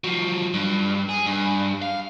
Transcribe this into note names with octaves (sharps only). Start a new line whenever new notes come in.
F3 F#3
G2
G#4
G2
F5